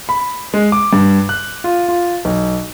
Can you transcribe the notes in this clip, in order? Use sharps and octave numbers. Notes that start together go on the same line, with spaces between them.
B5
G#3
D6
G2
F#6
F4
F4
B1